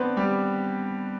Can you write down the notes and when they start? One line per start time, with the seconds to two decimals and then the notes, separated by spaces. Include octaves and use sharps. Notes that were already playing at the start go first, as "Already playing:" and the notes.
Already playing: B3 C4 D4 B4 C5
0.17 G3 G4